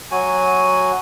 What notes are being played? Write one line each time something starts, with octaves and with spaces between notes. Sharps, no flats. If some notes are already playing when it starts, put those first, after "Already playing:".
F#3 F#4 G#5